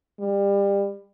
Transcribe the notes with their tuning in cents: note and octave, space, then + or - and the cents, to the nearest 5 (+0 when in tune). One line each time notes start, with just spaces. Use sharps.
G3 +25